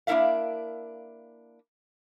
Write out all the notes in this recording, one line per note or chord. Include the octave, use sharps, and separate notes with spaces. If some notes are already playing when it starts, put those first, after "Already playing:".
A#3 D4 E4 A#4 E5 F5